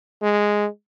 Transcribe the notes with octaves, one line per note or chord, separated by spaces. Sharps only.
G#3